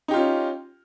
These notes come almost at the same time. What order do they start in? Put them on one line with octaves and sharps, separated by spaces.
D#4 G4 F4 C#4